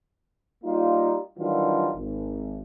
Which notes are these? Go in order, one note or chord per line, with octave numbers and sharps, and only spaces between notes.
G3 A#3 D#4 F4
D#3 E3 F#3 G3 D4 F4
G#1